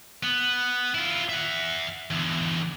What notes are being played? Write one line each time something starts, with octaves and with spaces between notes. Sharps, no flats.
B3
E4 F4
E5 F#5
E2 D3